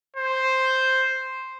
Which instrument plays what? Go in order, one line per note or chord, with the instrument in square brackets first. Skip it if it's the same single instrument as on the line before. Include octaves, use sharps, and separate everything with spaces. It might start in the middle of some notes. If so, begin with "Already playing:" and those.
[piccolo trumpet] C5